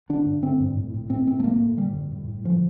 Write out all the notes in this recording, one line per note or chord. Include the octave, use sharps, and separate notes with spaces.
D3 D4
G2
D3 C4
G2
A2
A2
A2 C4
A2 C4
A3
A2 A#3
A2
D3 G3
F2
A2
A2
D3 F3